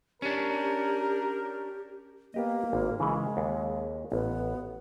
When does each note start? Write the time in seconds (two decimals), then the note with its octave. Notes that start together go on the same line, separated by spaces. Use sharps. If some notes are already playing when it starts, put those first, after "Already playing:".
0.22 C#4 D4 G4 A#4
2.34 A#3 B3 G4 D#5
2.73 G#1
3.00 C#3 E3 G#3
3.37 D#2
4.12 A1 B3